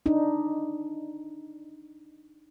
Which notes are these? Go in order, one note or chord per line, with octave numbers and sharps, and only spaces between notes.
D4 D#4